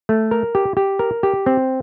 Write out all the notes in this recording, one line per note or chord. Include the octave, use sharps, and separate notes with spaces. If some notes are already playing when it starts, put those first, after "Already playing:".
A3
A#4
G4
G4
A#4
G4
C4